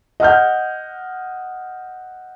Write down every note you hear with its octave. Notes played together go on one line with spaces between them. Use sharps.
D#5 F#5 F6 G6